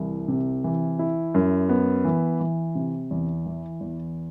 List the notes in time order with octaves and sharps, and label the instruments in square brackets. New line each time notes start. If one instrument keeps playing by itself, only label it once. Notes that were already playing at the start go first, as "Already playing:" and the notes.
Already playing: [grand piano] C2 E3
C3
E3
E4
F#2
B3
E3
E3
C3
E2
E3
E2